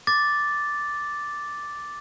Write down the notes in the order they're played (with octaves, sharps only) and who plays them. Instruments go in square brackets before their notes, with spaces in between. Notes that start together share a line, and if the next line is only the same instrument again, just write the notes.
[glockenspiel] D6 A6